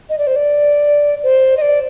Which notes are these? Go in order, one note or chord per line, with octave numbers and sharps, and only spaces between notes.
D#5
D5
C5
D5
C5
D#5
D5